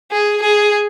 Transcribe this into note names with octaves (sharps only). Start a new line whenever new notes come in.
G#4
G#4